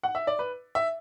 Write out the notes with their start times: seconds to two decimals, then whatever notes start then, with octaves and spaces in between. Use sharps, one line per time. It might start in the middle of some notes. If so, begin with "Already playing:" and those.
0.03 F#5
0.15 E5
0.27 D5
0.39 B4
0.75 E5